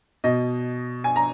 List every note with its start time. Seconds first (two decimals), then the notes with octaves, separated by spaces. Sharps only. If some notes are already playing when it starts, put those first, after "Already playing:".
0.24 B2 D#5
1.04 G#5
1.16 A#5